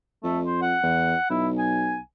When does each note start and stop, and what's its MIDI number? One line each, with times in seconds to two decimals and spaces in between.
0.24 0.76 41
0.24 0.39 57
0.46 0.58 72
0.62 1.28 78
0.83 1.15 40
1.30 2.01 35
1.30 1.48 64
1.59 1.98 80